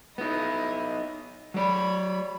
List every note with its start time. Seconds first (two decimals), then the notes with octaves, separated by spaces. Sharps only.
0.18 B3 D#4 E4 D#5
1.54 F#3 C#5 D5 B5